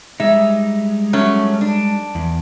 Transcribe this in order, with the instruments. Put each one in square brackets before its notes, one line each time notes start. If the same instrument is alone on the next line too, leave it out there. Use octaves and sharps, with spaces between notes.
[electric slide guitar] G3 G#3 D#4 [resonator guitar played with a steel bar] E5
[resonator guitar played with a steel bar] F#3 A3 C#4
D4
[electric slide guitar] E2